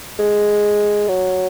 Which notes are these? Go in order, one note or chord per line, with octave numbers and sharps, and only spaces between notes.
G#3
F#3